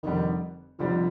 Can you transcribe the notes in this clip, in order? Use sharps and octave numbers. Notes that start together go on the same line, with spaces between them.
F1 F2 D3 D#3 G3
F1 F2 D3 F3 G3